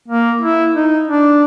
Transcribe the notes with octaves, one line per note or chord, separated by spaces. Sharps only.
A#3
E4
D#4
D4